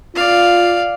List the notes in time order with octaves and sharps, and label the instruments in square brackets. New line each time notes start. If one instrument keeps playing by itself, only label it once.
[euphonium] F4 [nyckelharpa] D5 F5